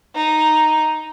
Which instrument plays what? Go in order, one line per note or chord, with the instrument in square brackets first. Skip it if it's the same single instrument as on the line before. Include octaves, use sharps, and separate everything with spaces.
[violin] D#4